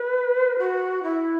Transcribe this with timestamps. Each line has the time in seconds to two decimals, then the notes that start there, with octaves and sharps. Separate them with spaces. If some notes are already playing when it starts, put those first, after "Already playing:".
Already playing: B4
0.58 F#4
1.03 E4